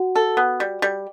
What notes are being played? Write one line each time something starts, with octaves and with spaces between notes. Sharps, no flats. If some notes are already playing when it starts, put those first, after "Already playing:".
Already playing: F#4 F#5
A4
B3
G3
G3